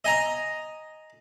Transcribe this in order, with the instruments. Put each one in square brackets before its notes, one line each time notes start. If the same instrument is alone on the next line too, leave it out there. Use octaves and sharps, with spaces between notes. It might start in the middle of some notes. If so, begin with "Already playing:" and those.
[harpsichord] D#5 G#5 A#5